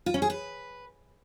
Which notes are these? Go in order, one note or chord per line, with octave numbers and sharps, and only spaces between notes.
F4
C#4
G#4
B4